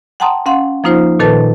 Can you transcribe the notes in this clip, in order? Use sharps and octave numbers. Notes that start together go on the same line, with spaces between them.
F#5 G5 A5 A#5 C6 D#6
C#4 F5 F#5 C6
F3 A#3 D#4 F4 C5
A#2 D#3 A4 B4 A5